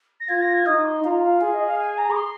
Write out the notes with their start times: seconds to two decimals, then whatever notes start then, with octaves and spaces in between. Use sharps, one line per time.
0.20 A#6
0.29 F4 G#6
0.41 A#6
0.54 G#6
0.66 D#4 D#6
0.85 C6
1.04 F4 A#5
1.22 F5
1.41 G#4 F5
1.53 D#5
1.66 F5
1.78 G#5
1.98 A#5
2.11 D#6
2.16 C6